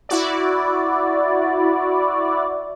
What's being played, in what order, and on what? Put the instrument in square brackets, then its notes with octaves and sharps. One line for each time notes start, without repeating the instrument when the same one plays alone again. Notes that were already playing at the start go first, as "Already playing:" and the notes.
[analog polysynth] E4 F#4 D5